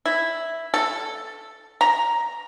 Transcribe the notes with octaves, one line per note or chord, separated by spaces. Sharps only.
E4
A4
A#5